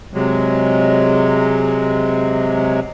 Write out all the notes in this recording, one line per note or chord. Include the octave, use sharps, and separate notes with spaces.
C3 F#3 G#3